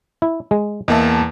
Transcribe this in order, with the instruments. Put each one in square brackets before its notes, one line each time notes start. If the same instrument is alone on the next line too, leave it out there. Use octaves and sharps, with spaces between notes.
[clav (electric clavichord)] E4
G#3
[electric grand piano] E2 A#3 A5 [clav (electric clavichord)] D#5 E5